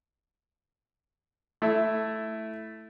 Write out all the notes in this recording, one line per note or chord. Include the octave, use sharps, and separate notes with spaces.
A3 E4